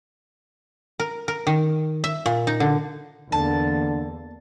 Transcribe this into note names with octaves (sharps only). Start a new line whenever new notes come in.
A#4
A#4
D#3
E5
A#2
D#4
D3
E2 D3 A#3 A5